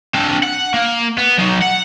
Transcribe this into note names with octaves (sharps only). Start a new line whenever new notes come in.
C4 D4
F#5
A#3
B3
F#3 D#4
F#5